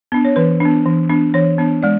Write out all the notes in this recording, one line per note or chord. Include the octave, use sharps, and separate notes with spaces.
B3 D4
C#5
E3 B4
D4
B3
E3
B3 D4
E3 C#5
B3 D4
G#3 D5